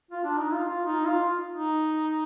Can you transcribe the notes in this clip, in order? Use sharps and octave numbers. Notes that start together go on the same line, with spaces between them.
F4
D4
D#4
F4
F4
D#4
F4
D#4